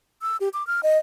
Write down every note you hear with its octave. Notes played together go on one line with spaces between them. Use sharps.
E6
G4
D6
F6
D#5